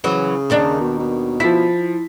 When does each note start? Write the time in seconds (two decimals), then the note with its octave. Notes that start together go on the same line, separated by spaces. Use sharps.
0.04 C#3 E3 F#3
0.50 D#2 D#3 D4
0.81 B2
0.99 B2
1.40 F3 E4 B6